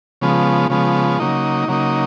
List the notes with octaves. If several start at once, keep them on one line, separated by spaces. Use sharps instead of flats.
C#3 F3 G#3 B3
C#3 F3 G#3 B3
C#3 F#3 A#3 D#4
C#3 F#3 A#3 D#4